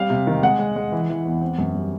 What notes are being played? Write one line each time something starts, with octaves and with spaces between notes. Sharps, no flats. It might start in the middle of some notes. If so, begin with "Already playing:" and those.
Already playing: G3 C4 F5
C3
D#3
G#3 F#5
G#3
G#3
E3
E3
E2
C4
F#2
G3